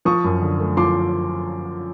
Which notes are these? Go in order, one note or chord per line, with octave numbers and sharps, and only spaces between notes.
F3 C#6 D#6
F#2
D3
A3
F3 C6 D6